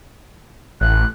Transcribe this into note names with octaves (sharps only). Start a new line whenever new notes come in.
A1 F#6